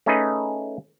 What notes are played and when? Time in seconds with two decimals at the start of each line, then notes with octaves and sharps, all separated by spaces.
0.06 A3 C#4 D#4 G#4 B4 D#5